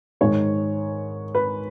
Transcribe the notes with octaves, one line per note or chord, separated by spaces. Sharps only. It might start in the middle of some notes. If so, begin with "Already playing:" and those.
G#2 D#3 G#3 C#5
B4